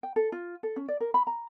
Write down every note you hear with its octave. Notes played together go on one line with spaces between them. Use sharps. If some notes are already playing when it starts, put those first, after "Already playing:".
G5
A4
F4
A4
C#4
D5
A#4
B5
A#5